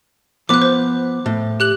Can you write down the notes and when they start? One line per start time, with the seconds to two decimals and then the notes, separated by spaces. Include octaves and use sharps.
0.49 F3 B3 D6 F#6
0.62 C5
1.26 A2
1.60 G4 F#6 F#7